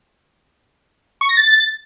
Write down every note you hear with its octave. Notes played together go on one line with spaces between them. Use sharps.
C#6
A#6
A6